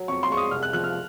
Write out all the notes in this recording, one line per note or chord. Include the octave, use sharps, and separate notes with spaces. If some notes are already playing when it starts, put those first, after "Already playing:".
Already playing: F#3
F2 C#6
C6
G#3 C#6
D#6
C2 F6
F#6
F3 F#6
F6